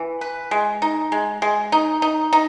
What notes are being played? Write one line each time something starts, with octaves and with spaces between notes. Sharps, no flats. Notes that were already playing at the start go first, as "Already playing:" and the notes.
Already playing: E3
B4
G#3
D#4
G#3
G#3
D#4
D#4
D#4